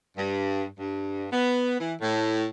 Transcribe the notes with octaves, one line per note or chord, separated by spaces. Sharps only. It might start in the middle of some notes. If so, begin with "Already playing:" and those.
G2
G2
B3
E3
A2